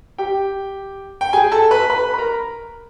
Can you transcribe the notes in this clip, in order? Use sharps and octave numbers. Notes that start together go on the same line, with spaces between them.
G4 G5
G5
G#4 G#5
A4 A5
B4 B5
B4 B5
B5
A#4 A#5